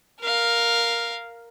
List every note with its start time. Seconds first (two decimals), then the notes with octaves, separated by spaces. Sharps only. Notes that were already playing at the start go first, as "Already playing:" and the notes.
0.20 A#4 F5